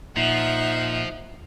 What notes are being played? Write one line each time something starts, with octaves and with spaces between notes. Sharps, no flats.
A#2 F3 D#4 E5 F#5